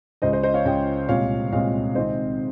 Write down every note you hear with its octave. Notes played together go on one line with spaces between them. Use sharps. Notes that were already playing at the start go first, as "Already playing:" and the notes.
C#2 C#3 G#3 C5 D#5
C5 D#5
C5 D#5
C#5 F5
C#2 C#3 G#3 D#5 G5
C2 A#2 G#3 C4 C#5 F5
C2 A#2 G#3 C4 C#5 F5
C3 D#3 G#3 C4 C5 D#5